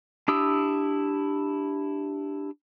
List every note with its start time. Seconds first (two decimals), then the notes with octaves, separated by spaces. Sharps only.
0.28 D4 E4 G4 D#6 E6